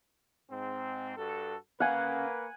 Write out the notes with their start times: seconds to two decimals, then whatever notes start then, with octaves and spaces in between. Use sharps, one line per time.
0.50 G#2 C4
1.17 G2 F#4 A4
1.80 A#3 C#4 B4 F5 F#5 G#5